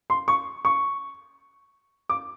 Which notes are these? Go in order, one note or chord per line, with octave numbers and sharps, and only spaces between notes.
C6
C#6
C#6
D6